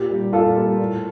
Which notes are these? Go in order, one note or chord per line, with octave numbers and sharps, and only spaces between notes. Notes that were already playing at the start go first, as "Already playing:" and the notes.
Already playing: A#2 G4
G3 A#3
A#2 F4 A4
G3 A#3
A2